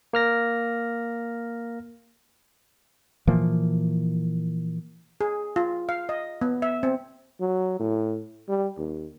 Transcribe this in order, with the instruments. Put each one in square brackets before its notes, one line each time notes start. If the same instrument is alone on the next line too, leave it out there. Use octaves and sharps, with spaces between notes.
[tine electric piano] A#3 F6 A#6
[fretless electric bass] A#2 E3 F3 A#3
[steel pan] G#4
F4
F5
D#5
B3
E5
C4
[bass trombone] F#3
A2
G3
D#2